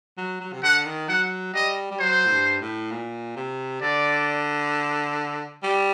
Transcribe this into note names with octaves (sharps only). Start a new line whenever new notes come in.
F#3
F#3
C3
D3 F#5
D#3
F#3 F#5
G3 D#5
G3
F#3 C5
A2
G2
A2
A#2
C3
D3 D5
G3